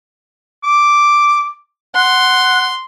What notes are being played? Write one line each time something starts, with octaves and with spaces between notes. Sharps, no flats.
D6
F#5 C6